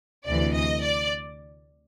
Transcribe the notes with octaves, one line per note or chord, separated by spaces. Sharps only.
D2 C3 E3 D5
D#5
D5